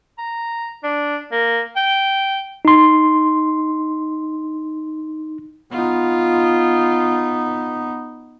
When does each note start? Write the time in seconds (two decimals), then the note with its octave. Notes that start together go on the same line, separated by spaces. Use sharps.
0.18 A#5
0.83 D4
1.32 A#3
1.76 G5
2.65 D#4 C6
5.72 B3 D#4 F4